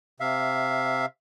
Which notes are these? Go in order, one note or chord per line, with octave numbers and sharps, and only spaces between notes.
C3 E5 F5